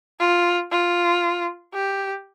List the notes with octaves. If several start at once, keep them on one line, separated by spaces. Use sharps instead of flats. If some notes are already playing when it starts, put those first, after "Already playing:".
F4
F4
G4